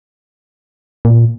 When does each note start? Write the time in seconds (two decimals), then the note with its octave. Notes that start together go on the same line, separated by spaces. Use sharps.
1.05 A#2